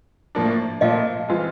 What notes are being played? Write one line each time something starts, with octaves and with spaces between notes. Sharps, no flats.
A2 F3 A#3 D4
A#2 F3 A3 D#5 F5
E3 G#3 C4 F4